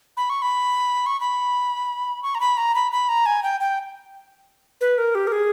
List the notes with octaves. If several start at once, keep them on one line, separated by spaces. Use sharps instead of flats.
B5
C#6
B5
C#6
B5
C#6
A#5
B5
A#5
B5
B5
A#5
G#5
G5
G5
B4
A#4
G4
A#4
G#4